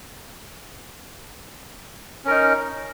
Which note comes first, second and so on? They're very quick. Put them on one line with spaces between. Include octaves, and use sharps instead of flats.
C#4 A#4 D#4